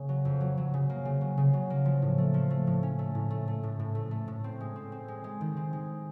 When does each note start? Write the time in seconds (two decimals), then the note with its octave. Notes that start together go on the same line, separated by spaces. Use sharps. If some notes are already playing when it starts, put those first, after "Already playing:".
Already playing: C#3 A#3
0.09 F#3
0.25 F2
0.41 F#3
0.57 F#3
0.74 C#3
0.90 A#3
1.05 C#3
1.21 F#3
1.38 C#3
1.53 F#3
1.70 A#3
1.86 F3
2.02 A2
2.18 A3
2.34 F3
2.50 A3
2.67 A2
2.83 C#4
2.99 A3
3.15 A2
3.30 A3
3.48 A3
3.63 A2
3.80 A2
3.95 A3
4.11 A3
4.28 A2
4.44 C4
4.61 G#3
4.76 C4
4.92 C4
5.08 G#3
5.24 G#3
5.41 D#3
5.57 C4
5.73 G#3